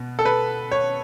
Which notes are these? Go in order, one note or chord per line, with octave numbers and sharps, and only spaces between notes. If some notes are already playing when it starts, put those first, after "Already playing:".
Already playing: B2 B3
A4
B4
C#5